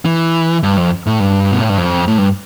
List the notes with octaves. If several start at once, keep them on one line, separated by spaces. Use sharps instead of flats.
E3
G2
F2
A2
G2
B2
A2
G2
F2
A2
G2